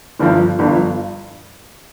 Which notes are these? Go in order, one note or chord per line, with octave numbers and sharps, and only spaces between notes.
G1 G2 F3
G1 G2 F3